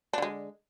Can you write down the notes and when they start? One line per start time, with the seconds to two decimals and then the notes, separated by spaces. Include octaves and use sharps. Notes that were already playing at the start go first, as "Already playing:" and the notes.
0.13 D4
0.18 D3
0.22 G#3